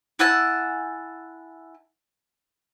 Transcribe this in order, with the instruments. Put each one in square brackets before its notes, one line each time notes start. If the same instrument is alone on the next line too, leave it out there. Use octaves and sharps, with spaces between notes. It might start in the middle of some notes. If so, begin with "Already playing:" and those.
[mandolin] E4 F#5 G#5 A5